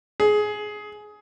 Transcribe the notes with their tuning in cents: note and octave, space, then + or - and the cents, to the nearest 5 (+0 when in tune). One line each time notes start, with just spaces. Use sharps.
G#4 +15